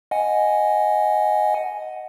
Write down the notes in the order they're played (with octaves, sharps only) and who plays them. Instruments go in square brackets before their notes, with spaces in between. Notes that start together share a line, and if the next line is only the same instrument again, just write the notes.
[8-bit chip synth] D#5 F#5 G#5